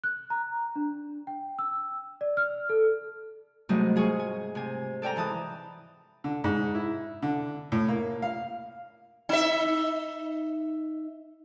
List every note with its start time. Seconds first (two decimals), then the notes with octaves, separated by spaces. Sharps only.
0.04 F#6
0.30 A#5
0.76 D4
1.27 G5
1.59 E6
2.21 D5
2.37 F6
2.69 A4
3.69 G#2 C3 F#3 G3 A3 D#5
3.96 F4 G#4 G#5 C#6
4.19 G#5
4.55 C3 G#5
5.02 A4 D5 G5 G#5 A#5
5.16 G#2 E3 A5 D#6
6.24 D3
6.44 G#2
6.75 E4
7.22 D3
7.72 A2
7.88 A#3
8.22 F5
9.29 D#4 E5